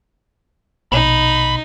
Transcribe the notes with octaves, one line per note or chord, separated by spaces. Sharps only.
A#1 B2 D#4 B5